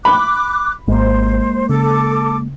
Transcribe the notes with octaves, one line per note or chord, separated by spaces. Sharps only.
B5 D6 F#6
G#1 G#3 A#3 C5
C#3 A4 D6